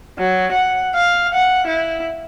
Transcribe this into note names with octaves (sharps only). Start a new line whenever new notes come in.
F#3
F#5
F5
F#5
E4